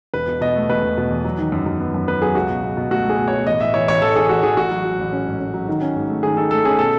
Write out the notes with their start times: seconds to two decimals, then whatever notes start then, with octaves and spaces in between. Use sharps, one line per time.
0.14 E1 B4
0.28 B2
0.41 B2 D#5
0.56 A3
0.69 E1 B4
0.83 E1
0.97 B2
1.10 E2
1.24 F#3
1.38 D#3
1.52 F#2
1.66 F#2
1.80 B3
1.94 F#2
2.07 B3 B4
2.22 F#3 G#4
2.35 C#2 F#4
2.50 B2
2.63 B2
2.77 B2
2.90 A3 F#4
3.05 A3 G#4
3.18 B2
3.28 C#5
3.33 B2
3.46 A1 D#5
3.60 A1 E5
3.74 E3 C#5
3.88 A1 C#5
4.02 A1 A4
4.16 A1 G#4
4.29 A1 F#4
4.43 A1 G#4
4.57 A1 F#4
4.71 F#3
4.85 F#3
4.99 A1
5.12 C#4
5.26 G#2
5.40 C#4
5.54 F#3
5.68 D#3
5.81 C#4
5.96 G#2
6.09 A3
6.23 D#3 G#4
6.37 D#3 A4
6.51 A3 A4
6.65 C#4 G#4
6.79 B2 A4